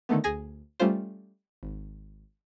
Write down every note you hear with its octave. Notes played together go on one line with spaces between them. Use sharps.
D3 D#3 A3 B3
D2 G#4 G#5 A#6
G3 A3 C#4 F4 C5
G#1